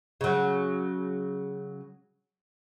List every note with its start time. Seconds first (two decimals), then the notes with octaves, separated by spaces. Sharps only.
0.21 C#3 F#3